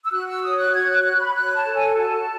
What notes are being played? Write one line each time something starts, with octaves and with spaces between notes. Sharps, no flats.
E6
F#4 F#6
E6
C#5 D#6
F#6
F#4 G#6
F#6
C#5 F#6
B5
C#5 F#6
A5
A4
G#5
F#4 A5